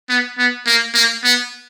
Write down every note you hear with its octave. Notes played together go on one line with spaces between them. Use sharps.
B3
B3
A#3
A#3
B3